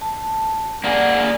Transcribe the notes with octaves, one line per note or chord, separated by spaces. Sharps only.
A5
A#3 G#4 D5 F#5